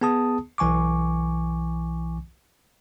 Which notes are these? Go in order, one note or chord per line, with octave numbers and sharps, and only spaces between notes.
B3 G#4 A5 D#6
B1 E3 G#5 C#6 D6